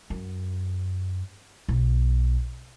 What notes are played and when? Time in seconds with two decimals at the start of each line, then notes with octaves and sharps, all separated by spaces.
0.10 F#2
1.69 B1